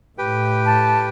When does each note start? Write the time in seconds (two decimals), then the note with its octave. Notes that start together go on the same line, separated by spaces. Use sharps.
0.18 A2 G4 B4 G5
0.65 A5